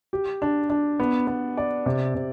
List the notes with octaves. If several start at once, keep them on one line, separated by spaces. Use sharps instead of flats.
G4
D4
D4
B3
B3
D5
C3
C3